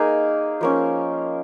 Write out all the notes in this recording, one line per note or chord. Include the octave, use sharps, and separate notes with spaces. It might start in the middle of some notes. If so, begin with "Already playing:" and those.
Already playing: A#3 D#4 G#4
F3 A#3 C#4